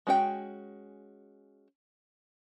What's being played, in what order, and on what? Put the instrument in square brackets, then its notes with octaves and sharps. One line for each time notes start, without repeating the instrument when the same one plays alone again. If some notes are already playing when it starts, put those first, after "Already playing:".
[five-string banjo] G#3 C#4 F#4 G#4 G5